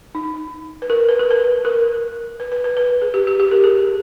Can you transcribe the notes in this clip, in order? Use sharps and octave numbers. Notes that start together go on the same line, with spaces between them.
D#4
B4
A#4
B4
A#4
B4
A#4
B4
B4
B4
B4
G#4
G4
G4
G4
A#4
G#4